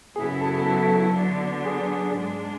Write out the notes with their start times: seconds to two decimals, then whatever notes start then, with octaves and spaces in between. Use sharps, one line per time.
0.16 F#2 C#3 F#3 B3 E4 G#4
0.41 A4
0.66 A4
1.16 D3 F#3 B3 D4
1.65 G#4
2.16 G#2 G#3 D4